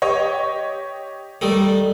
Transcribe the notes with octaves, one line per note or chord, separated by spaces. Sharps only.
G4 C#5 D#5
D#3 G3 A3